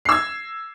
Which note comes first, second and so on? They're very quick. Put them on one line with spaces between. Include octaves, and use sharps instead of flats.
C7 E6 G#6